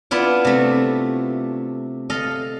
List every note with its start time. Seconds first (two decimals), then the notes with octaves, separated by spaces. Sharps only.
0.11 B3 D4 E4 F4
0.44 C3 A3
2.10 A4 D#5 F5